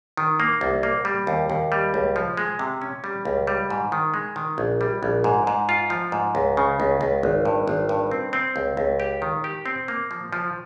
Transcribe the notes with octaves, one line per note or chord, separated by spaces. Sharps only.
D#3
A#3
C2
A#3
G3
D#2
D#2
G3
C#2
F3
G#3
C3
C#4
G3
C#2
G3
G#2
D#3
G#3
D#3
A#1
G3
A#1
G#2
G#2
F4
F3
G#2
C#2
C#3
C#2
C#2
G#1
G2
G#1
G2
C4
C4
C#2
C#2
G4
D#3
G4
C4
A#3
F3
F3